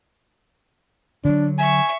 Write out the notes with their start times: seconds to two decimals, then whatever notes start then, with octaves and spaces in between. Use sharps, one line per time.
1.25 D3 F#3 D4
1.59 E5 G#5 C#6